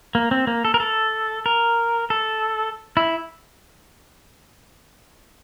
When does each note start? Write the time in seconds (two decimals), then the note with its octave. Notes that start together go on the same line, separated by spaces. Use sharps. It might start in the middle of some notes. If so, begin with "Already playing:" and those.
0.15 A#3
0.31 C4
0.47 A#3
0.65 A4
0.74 A#4
0.80 A4
1.46 A#4
2.10 A4
2.97 E4